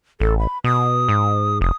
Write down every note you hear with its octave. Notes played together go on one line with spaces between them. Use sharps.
A1 A4
B5
B2 D#6
G#2
F1 D#6